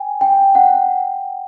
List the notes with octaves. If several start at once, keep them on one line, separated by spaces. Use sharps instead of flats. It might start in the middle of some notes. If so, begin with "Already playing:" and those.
Already playing: G5 G#5
G5
F#5